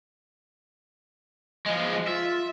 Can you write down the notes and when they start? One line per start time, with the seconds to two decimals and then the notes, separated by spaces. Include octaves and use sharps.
1.66 F3 G#3 D#5
2.07 F4 E5